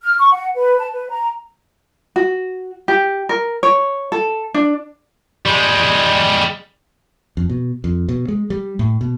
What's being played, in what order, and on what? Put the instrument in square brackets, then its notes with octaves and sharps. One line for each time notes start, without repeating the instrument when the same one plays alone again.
[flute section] F6
C#6
F#5
B4
A5
B4
A#5
[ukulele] F#4
G4
A#4
C#5
A4
D4
[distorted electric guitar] G3 G#3
[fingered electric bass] F2
B2
F2
B2
G#3
G3
A2
B2